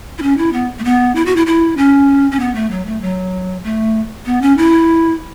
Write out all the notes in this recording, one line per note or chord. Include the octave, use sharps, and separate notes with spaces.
E4
C#4
E4
B3
A3
B3
E4
F#4
E4
E4
C#4
C#4
B3
A3
F#3
A3
F#3
A3
B3
C#4
E4